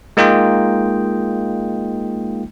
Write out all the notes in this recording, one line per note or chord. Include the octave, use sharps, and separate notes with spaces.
G#3 A#3 D#4 F4 D#5 G5